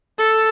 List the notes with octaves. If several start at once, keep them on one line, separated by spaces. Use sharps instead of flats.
A4